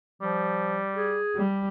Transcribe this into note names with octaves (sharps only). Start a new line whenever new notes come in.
F3 G3
G#4
G3